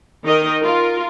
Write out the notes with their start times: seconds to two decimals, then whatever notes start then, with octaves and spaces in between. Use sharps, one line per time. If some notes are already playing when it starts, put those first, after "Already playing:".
0.24 D#3 D#4 A#4 D#5
0.61 F4 A#4